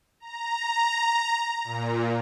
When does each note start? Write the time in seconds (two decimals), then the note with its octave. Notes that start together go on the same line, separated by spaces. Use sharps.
0.20 A#5
1.64 A#2